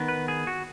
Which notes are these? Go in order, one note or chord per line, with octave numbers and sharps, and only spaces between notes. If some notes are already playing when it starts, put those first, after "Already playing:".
Already playing: D#3 B3
B4
G#4
F#4